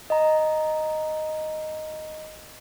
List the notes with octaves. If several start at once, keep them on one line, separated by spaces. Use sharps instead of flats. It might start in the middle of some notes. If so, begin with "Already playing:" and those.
D#5 A#5